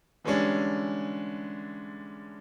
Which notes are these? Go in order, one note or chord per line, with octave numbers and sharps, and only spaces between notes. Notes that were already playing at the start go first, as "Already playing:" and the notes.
D3 E3 G3 G#3 C#4 D4